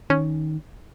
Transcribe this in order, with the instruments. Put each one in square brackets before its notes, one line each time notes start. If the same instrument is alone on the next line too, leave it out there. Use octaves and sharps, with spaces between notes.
[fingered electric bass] D#3 [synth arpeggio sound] C#4